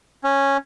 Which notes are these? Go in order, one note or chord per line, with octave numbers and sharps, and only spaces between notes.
C#4